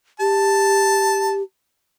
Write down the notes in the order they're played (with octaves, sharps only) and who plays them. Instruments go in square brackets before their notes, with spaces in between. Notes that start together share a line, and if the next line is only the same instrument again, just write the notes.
[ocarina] G4 [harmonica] A5